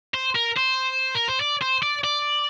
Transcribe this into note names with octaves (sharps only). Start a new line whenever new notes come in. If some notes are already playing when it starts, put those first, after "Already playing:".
C5
A#4
C5
A#4
C5
D5
C5
D5
D5